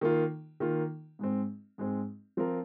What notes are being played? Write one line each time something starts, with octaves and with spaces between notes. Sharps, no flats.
D#3 A#3 F4
D#3 A#3 F4
G#2 G#3 C4
G#2 G#3 C4
F3 C4 F4 A#4